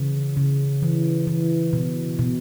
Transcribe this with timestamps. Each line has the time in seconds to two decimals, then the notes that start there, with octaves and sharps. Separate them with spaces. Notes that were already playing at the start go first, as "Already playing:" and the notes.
Already playing: C#3 E3
0.37 C#3
0.83 E3
1.27 E3
1.73 B2
2.19 B2